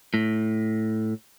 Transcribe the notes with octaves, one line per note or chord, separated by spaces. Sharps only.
A2